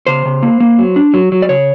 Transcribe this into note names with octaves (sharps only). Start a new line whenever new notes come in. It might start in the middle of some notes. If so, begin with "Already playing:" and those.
C#3 C5
C#3
A#3
A#3
F#3
D4
F#3
F#3
D5
C#3 C#5